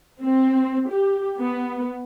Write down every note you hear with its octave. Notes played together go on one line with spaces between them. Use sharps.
C4
G4
B3